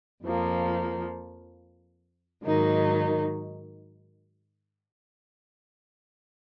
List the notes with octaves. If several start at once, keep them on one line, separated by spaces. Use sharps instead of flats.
F2 F3 A#3
G#2 D#3 F#3 A#3 D#4